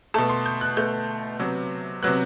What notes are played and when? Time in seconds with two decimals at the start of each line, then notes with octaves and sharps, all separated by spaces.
0.14 B2 A3 A5
0.29 C6
0.46 G6
0.61 F#6
0.77 B2 A3 G6
1.39 C3 F#3 B3
2.03 C3 F#3 B3 F#6